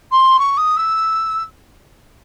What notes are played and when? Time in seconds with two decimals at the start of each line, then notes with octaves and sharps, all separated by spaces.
0.12 C6
0.39 C#6
0.57 D#6
0.76 E6